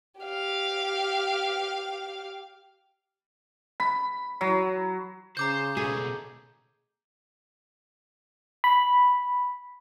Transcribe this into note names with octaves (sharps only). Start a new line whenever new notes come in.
G4 F5
B5
F#3
C#3 C5 A#5 D6 G6
B2 A3 G#4
B5